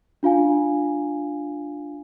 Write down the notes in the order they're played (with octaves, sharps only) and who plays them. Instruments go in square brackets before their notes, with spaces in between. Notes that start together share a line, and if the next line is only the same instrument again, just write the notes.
[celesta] D4 F4 F5 G#5